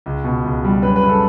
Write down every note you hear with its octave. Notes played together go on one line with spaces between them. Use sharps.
C#2
B2
C#2
G3
F#2 B4
B4
C#3
A4